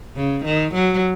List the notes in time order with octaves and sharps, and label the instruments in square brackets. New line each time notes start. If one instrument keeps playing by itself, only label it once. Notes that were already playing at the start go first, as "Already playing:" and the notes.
[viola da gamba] C#3
D#3
F#3